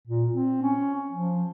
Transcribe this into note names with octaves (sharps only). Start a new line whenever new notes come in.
A#2
C4
C#4
F3